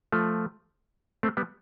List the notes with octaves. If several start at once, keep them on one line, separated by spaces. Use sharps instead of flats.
F3 A3
A3 C4
G3 B3